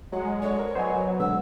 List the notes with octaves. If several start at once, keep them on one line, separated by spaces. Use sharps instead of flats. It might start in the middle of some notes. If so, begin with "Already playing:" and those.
F#3 G#3 F#5
D3 C#5
A#4 C5
F#3 B3 C5 D#5 G#5
B2 D3 G#3 B3 E6